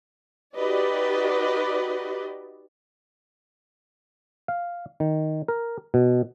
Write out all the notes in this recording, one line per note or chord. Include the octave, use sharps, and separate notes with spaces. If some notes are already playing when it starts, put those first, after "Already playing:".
D#4 F#4 G4 B4 D5 D#5
F5
D#3
A#4
B2